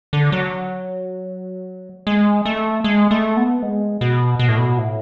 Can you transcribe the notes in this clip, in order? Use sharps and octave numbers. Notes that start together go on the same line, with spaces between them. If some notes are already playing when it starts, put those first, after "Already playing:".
D3
F#3
G#3
A3
G#3
A3
B3
G#3
B2
B2
A2
B2
A2